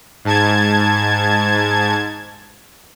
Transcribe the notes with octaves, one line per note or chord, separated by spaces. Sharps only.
G#2 A5 G#6